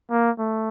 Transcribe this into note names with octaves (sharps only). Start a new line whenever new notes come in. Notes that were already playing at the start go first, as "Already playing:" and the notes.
A#3
A3